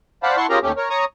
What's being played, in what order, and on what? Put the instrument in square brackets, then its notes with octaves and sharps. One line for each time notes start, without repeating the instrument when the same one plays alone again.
[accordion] C5 D5 F5 F#5 A5 B5
E4 F#5 A5 C6 C#6
C#4 F4 G4 G#4 A#4 A#5
D#2 A3 C#4 G4
A#4 C#5
C#5 A#5 C#6 D#6